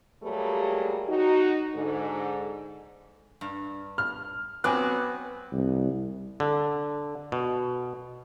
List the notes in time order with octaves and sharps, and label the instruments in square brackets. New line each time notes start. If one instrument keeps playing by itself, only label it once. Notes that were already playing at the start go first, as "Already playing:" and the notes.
[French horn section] F#3 G3 A3 A#3 G4 G#4
D#4 F#4
G#2 D3
[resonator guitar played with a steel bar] G2
[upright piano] F6
[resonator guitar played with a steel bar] F#3 C4 [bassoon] B3 [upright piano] G#5 D6 F#6
[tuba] C2
[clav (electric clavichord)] D3
B2